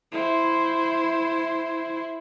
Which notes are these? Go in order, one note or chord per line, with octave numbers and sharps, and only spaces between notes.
E4 C5